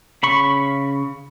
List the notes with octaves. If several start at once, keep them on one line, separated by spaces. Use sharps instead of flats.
C#3 B5 C#6